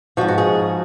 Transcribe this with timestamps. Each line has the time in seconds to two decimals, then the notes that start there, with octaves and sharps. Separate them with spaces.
0.17 F3 F#4
0.21 G#2
0.28 F#4
0.38 G#4